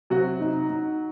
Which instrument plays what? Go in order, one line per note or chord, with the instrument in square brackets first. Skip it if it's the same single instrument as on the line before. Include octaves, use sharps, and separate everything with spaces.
[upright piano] C3 [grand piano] F#3 F#4
[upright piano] D#4
D#4